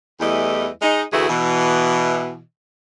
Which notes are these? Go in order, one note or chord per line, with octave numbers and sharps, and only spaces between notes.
E2 E3 G3 A3 D#5
G#3 D#4
D2 E3 A3 F#4 G#4
B2 E3